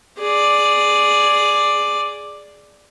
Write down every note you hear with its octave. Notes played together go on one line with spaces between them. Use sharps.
G#4 D5